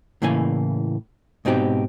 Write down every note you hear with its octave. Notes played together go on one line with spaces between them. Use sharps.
A2 C#3 E3 A#3 G#5
G#2 B2 C4 D#4 G4